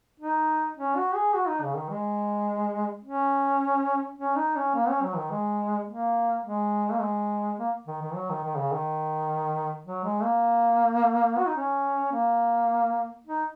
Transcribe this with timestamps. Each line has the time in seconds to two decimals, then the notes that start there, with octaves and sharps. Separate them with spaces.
0.20 D#4
0.77 C#4
0.96 F#4
1.15 G#4
1.34 F#4
1.48 D#4
1.62 C#3
1.77 D#3
1.90 G#3
3.05 C#4
4.18 C#4
4.36 D#4
4.56 C#4
4.75 A#3
4.89 C#4
5.03 F#3
5.17 D#3
5.31 G#3
5.88 A#3
6.45 G#3
6.92 A#3
7.01 G#3
7.58 A#3
7.87 D#3
8.02 D#3
8.15 F#3
8.30 D#3
8.44 D#3
8.57 C#3
8.73 D#3
9.86 F#3
10.04 G#3
10.23 A#3
11.38 F#4
11.48 D#4
11.56 C#4
12.12 A#3
13.27 D#4